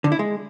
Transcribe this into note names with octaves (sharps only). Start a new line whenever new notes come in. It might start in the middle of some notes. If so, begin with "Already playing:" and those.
D3
E4
G#3